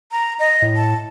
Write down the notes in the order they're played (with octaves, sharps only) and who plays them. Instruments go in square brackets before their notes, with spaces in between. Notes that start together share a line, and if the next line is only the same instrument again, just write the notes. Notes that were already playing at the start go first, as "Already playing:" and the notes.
[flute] A#5
D#5
[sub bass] A2
[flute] A5